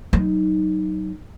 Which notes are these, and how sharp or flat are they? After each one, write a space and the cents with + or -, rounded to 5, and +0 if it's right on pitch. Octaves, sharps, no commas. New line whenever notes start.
F#3 +20 D#4 +0